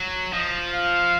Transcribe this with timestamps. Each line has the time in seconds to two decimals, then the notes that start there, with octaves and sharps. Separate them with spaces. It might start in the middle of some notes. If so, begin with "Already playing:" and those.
Already playing: F#3
0.33 F3 D#5
0.74 F5